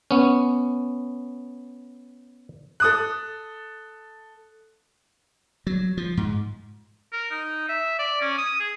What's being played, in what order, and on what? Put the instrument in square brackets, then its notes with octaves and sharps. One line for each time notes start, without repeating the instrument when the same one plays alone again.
[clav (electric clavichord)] B3 C#4
[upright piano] A4 D#6 F#6
[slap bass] F#3
F3
G#2
[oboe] A#4
D#4
E5
D5
C#4
D#6
G#4